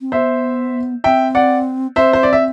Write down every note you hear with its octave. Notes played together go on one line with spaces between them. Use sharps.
C4
B3 C5 E5
C4 E5 G5
D5 F#5
C4 C5 E5
C5
D5
E5